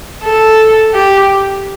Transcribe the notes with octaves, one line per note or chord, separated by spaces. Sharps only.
A4
G4